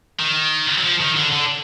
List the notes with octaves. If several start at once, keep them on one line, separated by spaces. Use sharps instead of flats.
D#3
F#3
F3
D#3
D3
D3